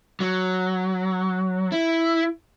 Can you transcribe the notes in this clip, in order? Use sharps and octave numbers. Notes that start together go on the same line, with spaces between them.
F#3
E4